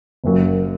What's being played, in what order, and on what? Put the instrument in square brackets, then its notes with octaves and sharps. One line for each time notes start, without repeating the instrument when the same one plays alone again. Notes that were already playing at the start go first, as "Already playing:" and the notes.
[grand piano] F#1 F#2 F#3 A#3